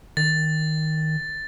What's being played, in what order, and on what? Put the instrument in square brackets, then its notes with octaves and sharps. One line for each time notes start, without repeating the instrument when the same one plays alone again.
[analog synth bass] D#3 [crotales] A6